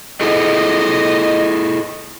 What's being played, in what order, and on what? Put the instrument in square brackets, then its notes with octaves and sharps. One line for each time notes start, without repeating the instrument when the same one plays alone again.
[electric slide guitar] E4 G#4 A4 [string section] D#5